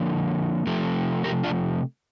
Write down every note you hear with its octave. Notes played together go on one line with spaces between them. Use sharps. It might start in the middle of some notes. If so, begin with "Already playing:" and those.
Already playing: D3 F3 A#3
C3 F3 A3
G4 A#4
D4 F4